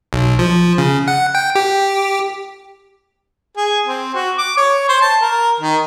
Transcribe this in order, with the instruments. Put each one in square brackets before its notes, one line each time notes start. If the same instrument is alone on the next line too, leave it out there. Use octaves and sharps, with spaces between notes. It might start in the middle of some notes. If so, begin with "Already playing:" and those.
[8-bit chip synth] B1
F3
C#3
F#5
G5
G4
[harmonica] G#4
C4
F#4
D6
C#5
C5
A5
A#4
D#3